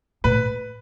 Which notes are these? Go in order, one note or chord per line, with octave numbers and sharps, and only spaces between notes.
A2 B4